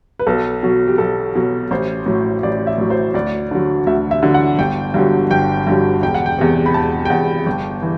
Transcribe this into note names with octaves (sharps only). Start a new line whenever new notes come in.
B4
B1 A4
B2 F#3
G4
B1 A4
B2 F#3
A1 C5
A2 F#3
A1 D5
E5
A2 F#3
C5
D2 D5
D3 F#3
D2 E5
E5
D3 F#3
F#5
G1 G5
G2 D3 F#3
G1 G5
G2 D3 F#3
E1 G5
F#5
G5
E2 C3
B5
E1 A5
G5
E2 C3 F#5
G1 G5
E3